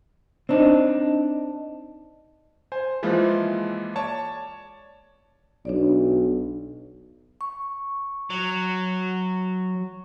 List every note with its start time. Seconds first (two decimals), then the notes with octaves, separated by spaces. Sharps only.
0.49 C4 D4 D#4
2.72 C5 G#5
3.03 E3 F3 G#3 A#3 E4 F4
3.96 C#5 D5 A5
5.65 B1 D4 C#5 D5
7.41 C#6
8.30 F#3